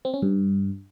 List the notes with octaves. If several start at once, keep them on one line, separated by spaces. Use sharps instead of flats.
C4
C#4
G2